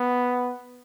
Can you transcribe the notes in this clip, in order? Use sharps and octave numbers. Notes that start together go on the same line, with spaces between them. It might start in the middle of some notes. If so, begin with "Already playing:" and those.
Already playing: B3